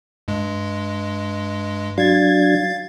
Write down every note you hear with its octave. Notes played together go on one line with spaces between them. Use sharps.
G2 G#3
F#3 D4 F5 G#6 A6